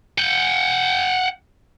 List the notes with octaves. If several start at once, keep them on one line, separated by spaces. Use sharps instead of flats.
F#5 G5